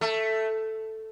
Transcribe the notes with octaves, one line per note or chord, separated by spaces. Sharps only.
A3